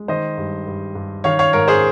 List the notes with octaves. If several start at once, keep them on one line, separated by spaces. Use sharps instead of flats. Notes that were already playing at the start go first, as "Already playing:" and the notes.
Already playing: G#3
D#3 C5 D#5
G2
G2
G2
D#3 C#5 F5
C#5 F5
G#2 A#4 C#5
G#4 C5